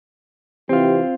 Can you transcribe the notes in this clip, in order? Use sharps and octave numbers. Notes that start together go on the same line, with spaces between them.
C3 E3 C4 F4 G4